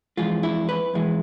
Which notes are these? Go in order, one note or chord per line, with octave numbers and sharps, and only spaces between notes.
F2 E3 G#3 F4
E4
B4
F2 E3 G#3